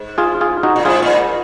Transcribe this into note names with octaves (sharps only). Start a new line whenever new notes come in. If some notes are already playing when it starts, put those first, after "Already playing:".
Already playing: G#2
F4 G#4
F4 G#4
D#4 F#4
A#2
G#2 F4 G#4
A#2